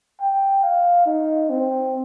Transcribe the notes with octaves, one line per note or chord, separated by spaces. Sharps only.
G5
F5
D#4
C4